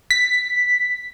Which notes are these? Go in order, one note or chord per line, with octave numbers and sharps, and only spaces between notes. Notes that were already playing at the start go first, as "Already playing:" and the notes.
B6